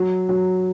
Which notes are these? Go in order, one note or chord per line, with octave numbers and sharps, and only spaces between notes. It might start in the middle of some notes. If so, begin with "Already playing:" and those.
Already playing: F#3
F#3